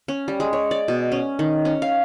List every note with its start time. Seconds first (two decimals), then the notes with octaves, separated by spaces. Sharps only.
0.08 C#4
0.28 G3
0.40 G#3
0.53 C#5
0.71 D5
0.88 B2
1.12 C#4
1.39 D#3
1.65 C#4
1.82 F5